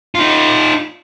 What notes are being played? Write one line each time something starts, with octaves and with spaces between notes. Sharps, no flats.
D#4 F4